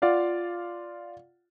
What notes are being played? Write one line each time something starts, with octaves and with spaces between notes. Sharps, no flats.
F4 D5 F5 F#5